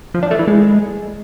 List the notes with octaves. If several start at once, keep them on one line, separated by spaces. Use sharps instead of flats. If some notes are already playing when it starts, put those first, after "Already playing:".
F3
D4
A3
E3
G#3